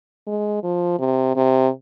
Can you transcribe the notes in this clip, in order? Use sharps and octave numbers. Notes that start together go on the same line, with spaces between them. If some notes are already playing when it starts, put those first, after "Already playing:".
G#3
F3
C3
C3